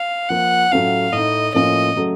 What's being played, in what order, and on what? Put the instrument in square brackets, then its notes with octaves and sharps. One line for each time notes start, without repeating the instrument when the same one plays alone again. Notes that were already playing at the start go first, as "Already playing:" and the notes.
Already playing: [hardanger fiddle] F5
[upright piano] F3 A#3 F4 [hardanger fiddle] F#5
[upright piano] A2 F#3 A3 C#4 F4 [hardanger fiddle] F5
[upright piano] A2 A3 D#4 [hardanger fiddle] D#5
[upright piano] A2 F3 A#3 C#4 F4 [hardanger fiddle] D#5
[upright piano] C#3 F#3 A3